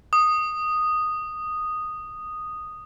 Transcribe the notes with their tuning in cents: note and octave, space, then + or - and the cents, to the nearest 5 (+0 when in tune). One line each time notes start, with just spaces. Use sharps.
D#6 -5